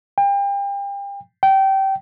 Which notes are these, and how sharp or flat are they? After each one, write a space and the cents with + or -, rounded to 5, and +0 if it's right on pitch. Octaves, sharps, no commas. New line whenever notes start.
G5 +35
G5 -20